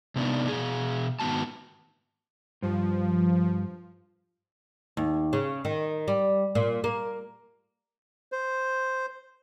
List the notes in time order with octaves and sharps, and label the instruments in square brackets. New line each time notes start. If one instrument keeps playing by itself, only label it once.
[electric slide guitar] C3 B3 D4 D#4
B2 G#4
G#2 D#3 G3 B3 F#4 A5
[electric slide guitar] G2 [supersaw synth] F3
[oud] D#2
C#3
D#3
G3
A#2
A#3
[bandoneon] C5